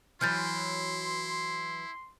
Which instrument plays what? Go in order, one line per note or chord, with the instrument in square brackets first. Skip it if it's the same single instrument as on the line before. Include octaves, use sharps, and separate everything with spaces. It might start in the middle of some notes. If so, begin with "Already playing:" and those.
[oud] E3 F#3 [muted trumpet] E4 [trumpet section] C6 [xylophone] F6 G6 A6